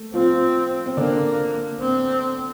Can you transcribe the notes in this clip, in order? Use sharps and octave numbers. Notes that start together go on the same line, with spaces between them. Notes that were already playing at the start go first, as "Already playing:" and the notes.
Already playing: A3
F3 C4 F4
C4
D3 A#3 D4
C4